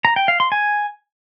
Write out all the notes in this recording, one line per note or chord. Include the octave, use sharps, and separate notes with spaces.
A#5
G5
F5
C6
G#5